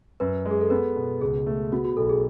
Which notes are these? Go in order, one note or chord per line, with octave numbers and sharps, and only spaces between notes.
F#2 B4
G#3
G#4
A4
B3 B4
B2
C#2 G#4
A3
B3 F#4
F#4
B1 A4
G#4